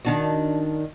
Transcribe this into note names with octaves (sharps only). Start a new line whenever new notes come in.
D#3 D4 F#4